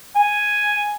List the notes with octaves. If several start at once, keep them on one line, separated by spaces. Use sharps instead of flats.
G#5